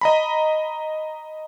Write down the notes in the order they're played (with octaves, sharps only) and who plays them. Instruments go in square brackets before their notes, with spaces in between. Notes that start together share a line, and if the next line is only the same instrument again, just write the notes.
[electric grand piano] D#5 A#5 B5